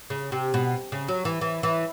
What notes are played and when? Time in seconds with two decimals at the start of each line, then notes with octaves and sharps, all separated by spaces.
0.10 C#3
0.32 C3
0.54 B2
0.92 C#3
1.08 F#3
1.25 E3
1.41 E3
1.63 E3